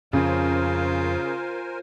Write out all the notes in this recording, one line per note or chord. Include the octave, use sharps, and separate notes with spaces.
F2 C#3 F4 A#4 C5 G#5